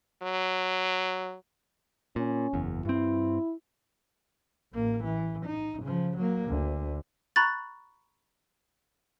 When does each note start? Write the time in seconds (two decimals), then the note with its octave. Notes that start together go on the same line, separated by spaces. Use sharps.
0.22 F#3
2.16 A#2 C#4
2.53 F#1 E2
2.85 G2 C4 E4
4.72 A1 A#3
5.04 E3
5.45 D#4
5.82 C#3 F3
6.17 F#3 A#3
6.48 D2
7.36 A#5 B5 C#6 F#6 A6